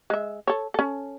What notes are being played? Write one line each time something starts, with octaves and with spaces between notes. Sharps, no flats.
G#3 E5
A4 C#5
C#4 A4